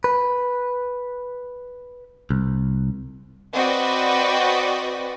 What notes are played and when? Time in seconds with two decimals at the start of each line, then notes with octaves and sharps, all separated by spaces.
0.04 B4
2.31 C2
3.54 C4 F#4 B4 D5 D#5 G5